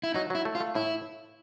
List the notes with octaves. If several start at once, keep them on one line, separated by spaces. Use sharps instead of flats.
E4
F#3 D#4
F#3 E4
A3
F4
A3
A2 E4